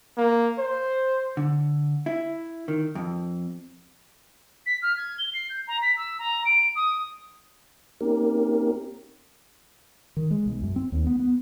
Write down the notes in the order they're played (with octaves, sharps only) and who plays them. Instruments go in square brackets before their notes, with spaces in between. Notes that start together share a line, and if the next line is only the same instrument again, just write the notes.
[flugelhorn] A#3
C5
[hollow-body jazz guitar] D3
E4
D#3
F2
[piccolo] B6
F6
G#6
G7
C7
G6
A#5
B6
E6
A#5
D7
D#6
[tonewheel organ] A#3 C4 C#4 D#4 G4 A#4
[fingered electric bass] D#3
G#3
B1
F#2
C4
D#2
B3
B3